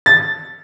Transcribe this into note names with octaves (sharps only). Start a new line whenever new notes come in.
A6